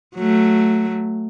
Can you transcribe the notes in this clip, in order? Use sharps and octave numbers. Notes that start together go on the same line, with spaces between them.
F#3 A3